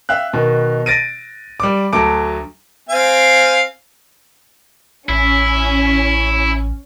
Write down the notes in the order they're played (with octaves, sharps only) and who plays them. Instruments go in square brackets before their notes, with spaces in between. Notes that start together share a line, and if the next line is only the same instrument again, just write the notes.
[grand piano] E5 F5 G5 F#6
B2 D#3
A6 A#6 D7 D#7
G3 D6
D2 F#3 A3 A5 D6 D7
[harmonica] C4 F5 G#5
[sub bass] A1 [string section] C#4 [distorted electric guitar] E4